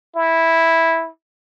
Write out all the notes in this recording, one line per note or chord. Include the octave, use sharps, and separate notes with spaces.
E4